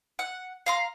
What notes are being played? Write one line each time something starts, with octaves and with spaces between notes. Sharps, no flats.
F#5
F5 A#5 C6